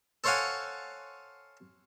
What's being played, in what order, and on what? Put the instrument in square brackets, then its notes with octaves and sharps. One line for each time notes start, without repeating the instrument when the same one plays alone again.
[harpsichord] A4 C5 C#5 F5 F#5 G#5